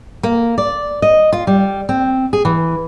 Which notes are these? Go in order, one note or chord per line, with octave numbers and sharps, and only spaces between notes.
A#3
D5
D#5
F4
G3
C4
G#4
E3